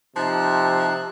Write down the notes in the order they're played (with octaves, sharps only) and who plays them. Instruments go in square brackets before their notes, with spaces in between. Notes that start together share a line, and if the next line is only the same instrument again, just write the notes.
[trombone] C3 [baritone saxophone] F3 [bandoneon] D#4 A5 F#6